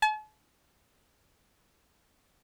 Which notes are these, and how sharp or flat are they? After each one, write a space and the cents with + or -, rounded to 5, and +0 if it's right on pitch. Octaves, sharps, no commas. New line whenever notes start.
A5 -45